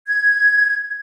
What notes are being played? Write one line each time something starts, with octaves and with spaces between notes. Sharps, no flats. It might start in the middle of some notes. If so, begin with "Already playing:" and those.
G#6